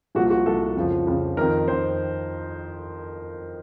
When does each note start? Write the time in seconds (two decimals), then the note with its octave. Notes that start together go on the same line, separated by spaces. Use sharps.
0.15 C2 A#2 F3 F#4
0.30 F#4
0.46 C2 A#2 F3 A4
0.76 F2 C#3 F3
1.07 F2 C#3 F3
1.37 F2 D#3 A#4
1.68 F2 D#3 C5